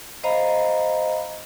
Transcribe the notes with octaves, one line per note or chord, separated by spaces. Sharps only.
C5 D#5 F5 A#5 B5